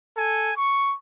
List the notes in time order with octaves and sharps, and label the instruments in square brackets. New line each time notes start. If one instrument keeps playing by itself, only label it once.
[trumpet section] A4 G#5
C#6